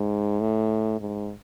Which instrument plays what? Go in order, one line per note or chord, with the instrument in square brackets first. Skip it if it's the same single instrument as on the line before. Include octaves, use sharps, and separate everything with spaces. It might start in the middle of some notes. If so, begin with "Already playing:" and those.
Already playing: [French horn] G#2
A2
G#2